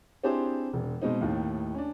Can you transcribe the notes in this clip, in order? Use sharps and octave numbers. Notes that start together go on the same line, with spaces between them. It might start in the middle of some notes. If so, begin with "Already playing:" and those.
C4 D4 E4 G4 G#4 C5
E1
B2 G#3 C4 D#4
D#2 A2 D#3
C#4 D4